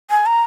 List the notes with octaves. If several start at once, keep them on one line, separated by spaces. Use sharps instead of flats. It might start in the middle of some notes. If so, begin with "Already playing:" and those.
G#5
A#5